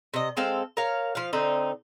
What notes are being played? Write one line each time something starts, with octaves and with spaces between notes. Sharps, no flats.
C3 D#5
G#3 C4 A4 F5
A#4 C#5 F5
F3 F5
D3 C4 D#4